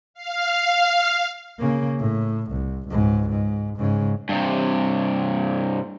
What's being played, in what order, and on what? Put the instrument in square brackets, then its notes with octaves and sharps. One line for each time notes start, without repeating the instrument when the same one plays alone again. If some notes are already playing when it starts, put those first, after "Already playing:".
[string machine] F5
[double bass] C#3 A#3
A2
C2
C#2 G#2
G#2
G#2 C#3
[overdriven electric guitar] G2 C3